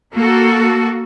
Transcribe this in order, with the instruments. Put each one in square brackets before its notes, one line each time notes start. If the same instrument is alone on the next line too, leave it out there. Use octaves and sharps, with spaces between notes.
[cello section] A#3 F#4 A4